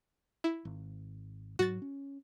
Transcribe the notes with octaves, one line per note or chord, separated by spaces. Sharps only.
E4
G#1
G#2 F#3 F#4 A6
C#4